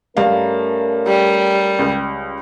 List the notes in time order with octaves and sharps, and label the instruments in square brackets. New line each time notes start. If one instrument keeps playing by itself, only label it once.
[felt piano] G2 F5 [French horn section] A3 C#4 A#4
[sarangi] G3
[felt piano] C#2